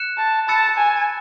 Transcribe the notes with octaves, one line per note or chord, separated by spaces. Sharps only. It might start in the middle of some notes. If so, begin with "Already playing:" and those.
Already playing: F#6 C#7 E7
A5
A5 B5 E6 A6 C#7 E7
G#5